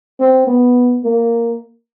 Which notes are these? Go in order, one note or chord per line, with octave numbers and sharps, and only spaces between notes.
C4
B3
A#3